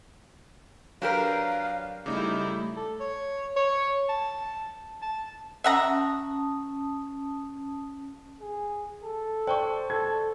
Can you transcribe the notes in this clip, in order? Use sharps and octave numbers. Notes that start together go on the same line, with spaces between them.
F#3 D4 G4 A#4 B4 F5
C#3 G3 A3 D#4 E4 D6
A4
C#5
C#5
A5
A5
C#4 E5 F#5 A5 A#5 D#6
G#4
A4
C5 D5 G5 C#6
A4 G#6